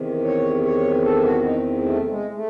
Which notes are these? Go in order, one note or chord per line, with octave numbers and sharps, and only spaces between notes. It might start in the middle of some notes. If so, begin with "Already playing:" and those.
Already playing: E2 C3 D#3
C#5
C#5
A4
F#4
D#4
A3
G#3
A3